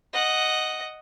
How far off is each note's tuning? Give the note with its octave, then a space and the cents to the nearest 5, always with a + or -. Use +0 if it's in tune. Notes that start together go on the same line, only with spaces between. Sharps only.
D#5 +0 F#5 +0